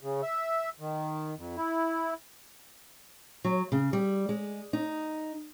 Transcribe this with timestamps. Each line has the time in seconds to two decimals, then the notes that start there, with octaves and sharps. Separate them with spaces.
0.01 C#3
0.22 E5
0.80 D#3
1.38 F2
1.57 E4
3.45 F#3
3.72 C#3
3.93 G3
4.29 G#3
4.73 D#4